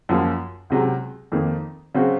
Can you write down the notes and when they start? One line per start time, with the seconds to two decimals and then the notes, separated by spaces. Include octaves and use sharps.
0.09 F#2 F3 A#3
0.70 C#2 C3 F#3
1.32 F2 D#3 A#3
1.95 C#3 F#3 C4 F#4